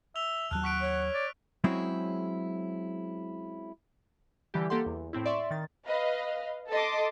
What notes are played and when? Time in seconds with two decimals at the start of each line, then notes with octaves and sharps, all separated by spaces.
0.16 E5 E6 F7 G7
0.51 D#2 F#3 A5 F6 F#6
0.64 F#5 C#6 B6 D7
0.80 C#5
1.14 D5
1.64 F#3 G#3 C4 C#4 E4 G#4
4.54 D3 E3 G3 G4
4.70 A#3 G4 A4 F#5 C6
4.86 E2
5.13 A2 C4 E4
5.26 D5 E5 C6 C#6
5.51 D#3 A6
5.86 B4 D#5 F5
6.69 A4 D#5 A5 C6 D6